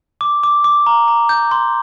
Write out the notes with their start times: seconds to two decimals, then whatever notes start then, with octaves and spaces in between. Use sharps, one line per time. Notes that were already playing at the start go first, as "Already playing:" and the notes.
0.21 D6
0.43 D6
0.64 D6
0.86 A#5
1.08 A#5
1.29 G6
1.51 C6